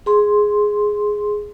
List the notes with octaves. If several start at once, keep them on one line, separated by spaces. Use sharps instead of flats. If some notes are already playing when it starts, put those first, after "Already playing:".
G#4 C6